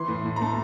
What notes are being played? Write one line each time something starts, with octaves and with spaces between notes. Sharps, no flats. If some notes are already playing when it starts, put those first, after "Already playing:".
Already playing: E3 C6
A2
A2
A#5
A3